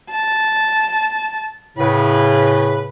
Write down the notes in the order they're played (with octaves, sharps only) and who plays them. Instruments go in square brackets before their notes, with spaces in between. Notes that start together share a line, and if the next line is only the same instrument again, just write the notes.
[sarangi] A5
[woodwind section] A2 C#3 [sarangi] B4